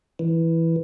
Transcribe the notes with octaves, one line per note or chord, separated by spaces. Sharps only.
E3